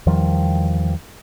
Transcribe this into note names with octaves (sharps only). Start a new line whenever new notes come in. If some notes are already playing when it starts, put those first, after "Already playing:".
E2 D#3 F3 G3